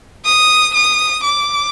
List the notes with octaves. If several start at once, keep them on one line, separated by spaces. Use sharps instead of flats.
D#6
D#6
D6